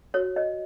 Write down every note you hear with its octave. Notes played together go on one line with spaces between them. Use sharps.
F#4 C#5
C#5 D#5